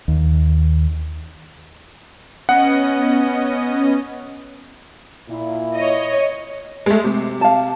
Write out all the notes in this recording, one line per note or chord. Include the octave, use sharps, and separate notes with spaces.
D#2
B3 C#4 D#5 F#5
A#2 E4
C#5 D#5
G#3 A3
C3
F5 A5